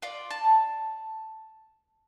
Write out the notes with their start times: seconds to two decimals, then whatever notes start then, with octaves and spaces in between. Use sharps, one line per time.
0.02 F4 D5
0.31 A5